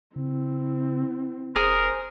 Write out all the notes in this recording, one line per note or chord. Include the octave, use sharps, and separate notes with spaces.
C#3 C4 E4
F1 G#4 A#4 C5 D#6